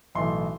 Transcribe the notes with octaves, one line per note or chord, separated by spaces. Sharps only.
B1 A2 E3 C6